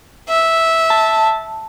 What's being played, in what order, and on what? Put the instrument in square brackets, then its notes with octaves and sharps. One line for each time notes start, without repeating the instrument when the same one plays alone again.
[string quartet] E5
[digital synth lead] A5